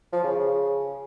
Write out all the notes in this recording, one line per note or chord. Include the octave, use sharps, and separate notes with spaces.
F3
C#3
C#3